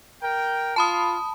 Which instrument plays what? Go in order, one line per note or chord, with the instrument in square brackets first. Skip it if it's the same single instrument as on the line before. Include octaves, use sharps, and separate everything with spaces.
[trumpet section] A#4 G5
[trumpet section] F4 [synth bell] A5 B5 D#6